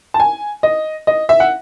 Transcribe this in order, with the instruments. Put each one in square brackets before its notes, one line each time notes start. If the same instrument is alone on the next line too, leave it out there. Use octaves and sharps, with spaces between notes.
[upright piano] A5
G#5
D#5
D#5
E5
F#5